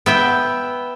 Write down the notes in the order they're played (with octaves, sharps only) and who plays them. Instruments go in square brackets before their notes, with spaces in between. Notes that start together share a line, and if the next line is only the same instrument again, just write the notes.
[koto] B3 E5 G5